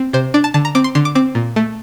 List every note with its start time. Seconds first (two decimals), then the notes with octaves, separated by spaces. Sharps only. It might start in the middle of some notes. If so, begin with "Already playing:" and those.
Already playing: C4
0.13 C3 C5
0.34 D4 D5
0.44 A5
0.54 D3 A5
0.65 A#5
0.75 C4 D6
0.84 C6
0.95 D3 C6
1.05 D6
1.15 C4 D6
1.35 A#2
1.56 A3